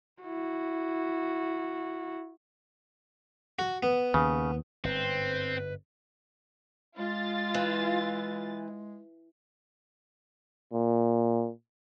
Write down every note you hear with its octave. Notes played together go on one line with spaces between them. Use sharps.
E4 F#4
F#4
B3
D#2 C#3
G1 G#2 C4 B4
G#3 F4 A6
E3
A#2